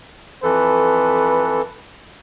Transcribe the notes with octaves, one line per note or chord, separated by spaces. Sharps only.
F2 E3 A4 B4